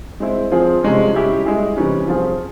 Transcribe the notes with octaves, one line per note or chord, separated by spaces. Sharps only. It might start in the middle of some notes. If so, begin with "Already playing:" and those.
G#3 C4 E4
F3 C4 F4 G#4
C3 F3 G#3 C#4
G3 C#4 E4 G4
G#3 E4 G#4
C3 E3 G3 C#4
F3 C4 F4 G#4